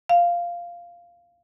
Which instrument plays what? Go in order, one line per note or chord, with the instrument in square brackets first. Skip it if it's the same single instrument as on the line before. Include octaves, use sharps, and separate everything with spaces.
[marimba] F5